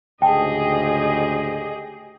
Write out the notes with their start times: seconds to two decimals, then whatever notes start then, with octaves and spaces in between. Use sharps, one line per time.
0.22 D2 G#2 C#3 G4 G#4 D#5 G5 A5